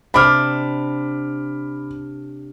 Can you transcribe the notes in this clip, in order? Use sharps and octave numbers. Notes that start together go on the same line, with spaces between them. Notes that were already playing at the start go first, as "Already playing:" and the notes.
C3 D4 B5 D6 F6